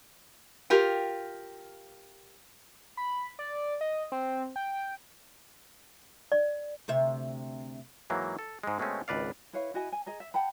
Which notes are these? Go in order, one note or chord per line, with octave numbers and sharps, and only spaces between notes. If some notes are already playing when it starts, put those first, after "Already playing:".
F4 G4 A#4 G5
B5
D5
D#5
C4
G5
D5
D2 C3 E5
G#2 E3 F#3 A#3
A4
G#2 G#3
B2 G#3 A3 C4 C#4
G#1 C#2 B4 D5 F5
E4 B4 C#5 F5
E4 F#4 D#5 G#5
G#5
G#4 D#5 A#5
E5
F#5 G5 A5 B5